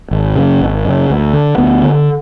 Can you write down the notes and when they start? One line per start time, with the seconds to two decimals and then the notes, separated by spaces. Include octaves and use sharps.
0.11 G#1
0.36 F#2 C#3
0.60 G#1
0.85 F#2 C#3
1.10 D2
1.33 D3
1.58 D2 B3
1.83 D3